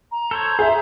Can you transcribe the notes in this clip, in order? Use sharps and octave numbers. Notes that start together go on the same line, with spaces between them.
A#5
A4 C5 C#5
G#4 C5 E5